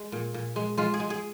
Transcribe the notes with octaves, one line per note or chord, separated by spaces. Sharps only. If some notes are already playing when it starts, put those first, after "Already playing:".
Already playing: G#3
A#2
A#2
G#3
G#3 F4
G#4
G#3
G#4